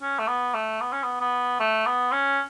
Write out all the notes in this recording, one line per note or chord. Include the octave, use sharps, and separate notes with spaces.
C#4
A3
B3
A3
B3
C#4
B3
B3
A3
B3
C#4